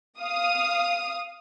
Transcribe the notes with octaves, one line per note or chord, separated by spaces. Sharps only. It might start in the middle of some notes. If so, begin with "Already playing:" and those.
F5 D#6